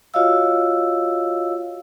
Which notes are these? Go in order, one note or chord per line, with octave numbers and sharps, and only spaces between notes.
F4 F#4 C#5 D#5 F5 E6